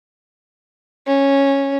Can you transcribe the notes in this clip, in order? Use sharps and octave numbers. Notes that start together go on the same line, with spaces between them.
C#4